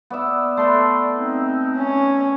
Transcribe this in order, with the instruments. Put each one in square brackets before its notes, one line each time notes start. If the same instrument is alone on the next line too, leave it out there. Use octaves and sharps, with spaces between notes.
[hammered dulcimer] B3 D5 E5
[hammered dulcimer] A3 B4 [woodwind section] D5 C6
[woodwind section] C4 D#4
[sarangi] C#4